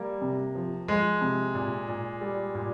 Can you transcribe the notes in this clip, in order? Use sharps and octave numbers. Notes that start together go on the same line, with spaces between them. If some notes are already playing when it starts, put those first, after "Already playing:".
Already playing: G3 A#3
C3
F3
F3 G#3
C3
A#2
A#2
G3
A#2